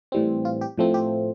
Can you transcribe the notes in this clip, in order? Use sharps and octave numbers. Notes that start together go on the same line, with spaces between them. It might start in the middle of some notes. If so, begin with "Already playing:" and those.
A2 E3 G3 C4
F4
G4
A2 F3 A3 C4
G4